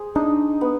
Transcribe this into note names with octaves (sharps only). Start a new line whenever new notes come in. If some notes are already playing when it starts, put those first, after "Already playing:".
Already playing: G#4 C5
D4 D#4
B3